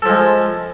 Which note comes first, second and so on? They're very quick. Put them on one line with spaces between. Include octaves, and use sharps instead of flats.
A4 F3 G#3